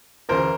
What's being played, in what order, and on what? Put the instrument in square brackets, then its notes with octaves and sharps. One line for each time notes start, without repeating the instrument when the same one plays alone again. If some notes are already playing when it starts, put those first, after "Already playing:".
[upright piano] D2 C#3 E3 A#4 C5